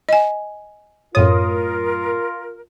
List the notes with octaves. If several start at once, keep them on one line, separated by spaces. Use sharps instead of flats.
D#5 G#5
F#2 A2 F4 A#4 C#5 D#6